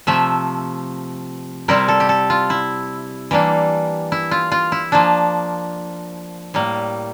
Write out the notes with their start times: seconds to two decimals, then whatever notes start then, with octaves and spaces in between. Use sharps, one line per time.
0.07 C3 F3 A3 E5
1.68 C3 G3 C4 E4 A#4
1.88 A4
2.00 G4
2.09 A4
2.30 F4
2.50 E4
3.31 E3 G3 A#3 D4
4.12 E4
4.31 F4
4.52 F4
4.72 E4
4.92 F3 A#3 D4
6.54 A2 G3 A#3